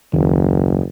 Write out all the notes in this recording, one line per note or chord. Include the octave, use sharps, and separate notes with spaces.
F#1 D#2